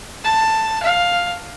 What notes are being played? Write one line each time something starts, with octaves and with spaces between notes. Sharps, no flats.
A5
F5